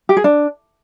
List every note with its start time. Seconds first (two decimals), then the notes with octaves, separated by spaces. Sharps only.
0.09 G4
0.17 G#4
0.24 D4